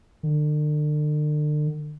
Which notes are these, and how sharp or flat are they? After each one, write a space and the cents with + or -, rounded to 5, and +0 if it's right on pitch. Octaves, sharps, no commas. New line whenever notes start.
D3 +40